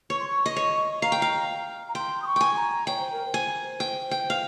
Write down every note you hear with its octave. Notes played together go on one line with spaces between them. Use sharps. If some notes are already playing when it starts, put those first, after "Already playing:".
C#5 C#6
C6
C#6
D#5
C#5
F5 A#5
G5
F5
A#5
G5 C6
D#6
C#6
G5 G#5
A#5
C#5 G5
C5
A#4
C5
G#5
G5
G5
F5